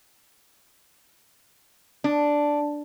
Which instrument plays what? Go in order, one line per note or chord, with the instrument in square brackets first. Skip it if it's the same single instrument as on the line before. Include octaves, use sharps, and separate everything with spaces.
[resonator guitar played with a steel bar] D4